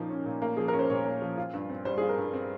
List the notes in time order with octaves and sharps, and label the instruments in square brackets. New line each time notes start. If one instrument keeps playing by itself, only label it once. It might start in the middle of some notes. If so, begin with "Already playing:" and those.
Already playing: [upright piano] A#2 F3 A#3 C#4 [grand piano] D#4
[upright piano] C#4
A#2
A#3
[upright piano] F3 [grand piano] G#4
[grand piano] A#4
[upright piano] C#4
[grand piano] C5
[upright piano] A#2 [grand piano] C#5
[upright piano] A#3
F3
F4
G2
C4
[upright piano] G3 [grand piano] C5
[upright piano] F4 [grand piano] G#4
[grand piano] A#4
[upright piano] G2
C4